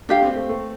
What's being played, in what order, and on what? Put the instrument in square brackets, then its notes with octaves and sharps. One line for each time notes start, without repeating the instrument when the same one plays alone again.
[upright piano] A3 [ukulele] D4 G4 F5
[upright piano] C4
A3
A3